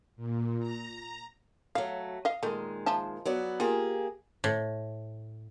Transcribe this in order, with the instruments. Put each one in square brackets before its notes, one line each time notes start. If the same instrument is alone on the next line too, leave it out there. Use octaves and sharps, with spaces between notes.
[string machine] A#2
A#5
[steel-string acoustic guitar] F#3 A3 [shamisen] F5
[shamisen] D#5 F5
[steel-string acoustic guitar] A#2 D#3 G#3 [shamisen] A3
[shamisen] F3 E5 A5
[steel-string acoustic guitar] F#3 B3 D5
[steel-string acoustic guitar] A#3 G4 G#4 [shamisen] F4
[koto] A2